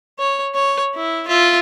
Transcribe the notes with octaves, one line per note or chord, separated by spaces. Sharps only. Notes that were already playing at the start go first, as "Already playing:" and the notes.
C#5
C#5
E4
F4 E5